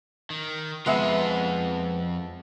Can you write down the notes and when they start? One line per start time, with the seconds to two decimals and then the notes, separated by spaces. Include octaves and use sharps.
0.30 D#3
0.86 F2 G#3 B3 F4 E5